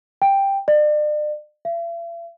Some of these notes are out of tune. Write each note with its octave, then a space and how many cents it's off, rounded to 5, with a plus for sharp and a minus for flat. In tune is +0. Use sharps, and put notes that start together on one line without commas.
G5 +5
D5 +40
E5 +45